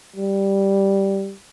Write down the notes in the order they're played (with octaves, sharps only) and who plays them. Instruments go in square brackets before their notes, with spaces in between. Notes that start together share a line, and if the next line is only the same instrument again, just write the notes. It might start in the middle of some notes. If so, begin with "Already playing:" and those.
[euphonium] G3